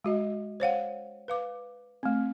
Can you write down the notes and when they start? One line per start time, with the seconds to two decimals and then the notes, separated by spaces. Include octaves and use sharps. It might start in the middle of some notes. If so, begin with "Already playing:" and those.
0.04 G#3 F#4 D#5
0.60 C5 C#5 F5 F#5
1.28 B4 F5 D6
2.03 A3 C4